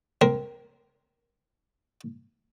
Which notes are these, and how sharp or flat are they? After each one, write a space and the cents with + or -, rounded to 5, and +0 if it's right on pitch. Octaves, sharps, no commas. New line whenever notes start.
C4 -10 A#4 +20